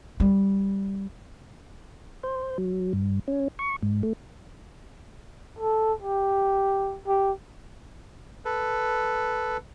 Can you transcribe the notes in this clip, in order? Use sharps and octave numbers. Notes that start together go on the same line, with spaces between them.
G3
C5
F#3
G2
C#4
C#6
G#2
A3
A4
G4
G4
A4 B4